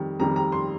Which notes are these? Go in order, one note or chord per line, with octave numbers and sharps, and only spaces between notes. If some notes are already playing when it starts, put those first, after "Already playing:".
Already playing: F2 D#3 G3
F2 D#3 G3 A#5
A#5
C6